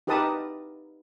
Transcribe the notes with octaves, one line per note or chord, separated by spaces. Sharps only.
D#4 G4 A#4 B4 A5 D#6